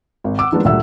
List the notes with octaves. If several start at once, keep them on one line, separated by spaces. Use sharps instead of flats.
G#1
F#5 D6 E6
D#3 F3 G#3 A#3 B3 D4
D2 A#2 G3 E5 F#5 E6